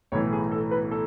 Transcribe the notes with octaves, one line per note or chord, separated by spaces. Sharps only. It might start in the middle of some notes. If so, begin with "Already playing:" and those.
B1 A2 E3 A3 C#5
G#4
A4
B4
A4